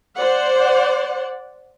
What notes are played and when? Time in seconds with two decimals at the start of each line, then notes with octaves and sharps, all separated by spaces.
0.17 C5 D5 F#5